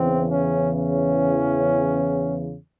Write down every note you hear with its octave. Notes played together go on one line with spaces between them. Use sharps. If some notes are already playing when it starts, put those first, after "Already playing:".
Already playing: E2 C#3 E3 C4
C#4
C#4